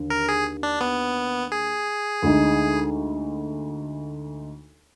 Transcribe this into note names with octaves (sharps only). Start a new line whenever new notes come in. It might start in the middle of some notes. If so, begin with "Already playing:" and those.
Already playing: D#2 D3
A#4
G#4
D4
B3
G#4
D2 D3 G#3 D#4